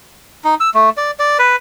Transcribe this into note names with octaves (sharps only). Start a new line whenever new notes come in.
D#4
E6
A3
D5
D5
B4